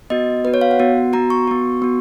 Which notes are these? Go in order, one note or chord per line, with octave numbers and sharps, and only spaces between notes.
B3 F#4 D#5
B3 F#4 B4
C#5
F5
F#5
B3 F#4
B3 F#4 A#5
C#6
B3 F#4
B3 F#4